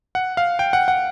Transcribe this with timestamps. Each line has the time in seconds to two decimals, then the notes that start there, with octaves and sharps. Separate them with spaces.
0.15 F#5
0.37 F5
0.59 G5
0.73 F#5
0.88 F#5